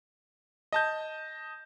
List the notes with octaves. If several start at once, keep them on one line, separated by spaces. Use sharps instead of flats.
D#5 A5 G6